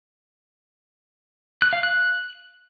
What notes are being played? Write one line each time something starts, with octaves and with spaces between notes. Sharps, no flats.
F#6
F5
F#6